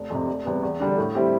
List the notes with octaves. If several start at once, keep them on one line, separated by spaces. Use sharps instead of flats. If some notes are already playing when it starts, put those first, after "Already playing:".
Already playing: F1
F2 C3
F1
E2 C3 G3 B3
E2
D3 G3 D4
A2
G3 C4 E4 G4